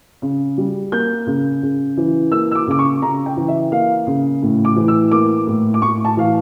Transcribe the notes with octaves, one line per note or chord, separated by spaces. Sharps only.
C#3
G3
A#3 G6
C#3
C#3
E3
A#3 E6
E6
D6
C#3 D6
C#6
C#3 A#5
G5
E3
E5
A#3 F5
C#3
A2
D6
E3
E6
A#3 D6
A2
D6
A2 C#6
A5
E3 F5